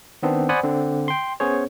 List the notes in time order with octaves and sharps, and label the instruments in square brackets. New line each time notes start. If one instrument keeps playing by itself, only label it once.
[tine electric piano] D#3 B3 C4 D4
C5 D5 F#5 G#5 B5 D#6
D3 C4
G5 C6
B3 C#4 G#4 C5 C#5